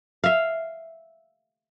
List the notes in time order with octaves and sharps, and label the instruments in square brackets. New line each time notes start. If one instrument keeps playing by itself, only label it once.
[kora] E5 F5